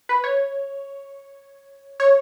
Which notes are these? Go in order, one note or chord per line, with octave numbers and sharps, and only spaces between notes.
B4
C#5
C#5